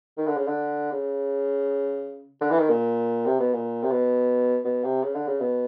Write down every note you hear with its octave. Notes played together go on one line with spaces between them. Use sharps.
D#3
D3
C#3
D3
C#3
D3
E3
D#3
A#2
C3
B2
A#2
C3
B2
B2
C3
C#3
D3
C#3
B2